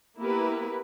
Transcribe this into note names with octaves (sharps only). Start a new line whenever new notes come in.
A#3 B3 E4 G4 A#4 B4